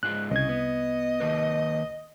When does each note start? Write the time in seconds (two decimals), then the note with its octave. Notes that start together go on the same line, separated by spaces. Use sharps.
0.03 G#2 G#3 F4 F#6
0.31 C2 C#3 D#5 G#6
0.49 B3
1.20 D#3 A#3 B4